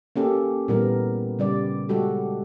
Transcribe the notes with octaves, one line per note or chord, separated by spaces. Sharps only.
A#3 C#4 G4 A4
A#2 E3 G3 B3 A#4
C#3 G3 D5
G3 G#3 F#4 G4 A4